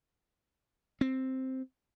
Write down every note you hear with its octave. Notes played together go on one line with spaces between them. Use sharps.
C4